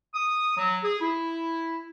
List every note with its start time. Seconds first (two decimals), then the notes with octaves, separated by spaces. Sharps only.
0.15 D#6
0.57 F#3
0.83 G#4
1.00 E4